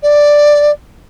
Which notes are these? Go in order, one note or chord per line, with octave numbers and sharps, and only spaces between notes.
D5